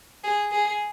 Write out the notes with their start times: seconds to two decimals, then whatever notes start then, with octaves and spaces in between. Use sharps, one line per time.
0.24 G#4
0.52 G#4